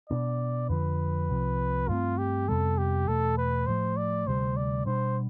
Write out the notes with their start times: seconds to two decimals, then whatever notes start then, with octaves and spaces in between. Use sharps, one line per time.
0.10 B2 B3 D4 D5
0.69 F2 D3 F3 B4
1.29 C2 C3 F3
1.88 G2 E3 A3 C4 F4
2.18 G4
2.48 F2 C3 G3 B3 A4
2.78 G4
3.08 E2 B2 A3 A4
3.38 B4
3.67 A2 F3 A3 C5
3.97 D5
4.26 D2 C3 G3 C5
4.57 D5
4.86 B2 G3 D4 C5